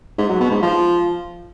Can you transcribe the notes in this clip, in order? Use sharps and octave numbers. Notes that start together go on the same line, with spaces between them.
G#2
F#3
B2
G#2
F3